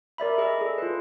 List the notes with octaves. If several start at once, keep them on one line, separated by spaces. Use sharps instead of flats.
A#4 D5 E5 B5
G#4 D#5 E5 E6
G#4 A4
F4 A4 B4